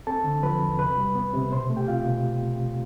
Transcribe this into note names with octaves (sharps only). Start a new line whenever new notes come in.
C4 A4 A5
D3
F3 B4 B5
E2
C3 B4 B5
G3
B3
C3
B2 C5 C6
A3
G4 G5
C4 F4 F5
B2